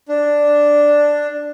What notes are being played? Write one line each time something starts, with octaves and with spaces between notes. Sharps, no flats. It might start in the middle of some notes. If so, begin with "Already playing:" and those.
D4